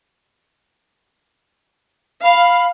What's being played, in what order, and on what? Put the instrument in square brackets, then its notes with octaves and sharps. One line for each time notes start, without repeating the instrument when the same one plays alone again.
[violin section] F5 [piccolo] B5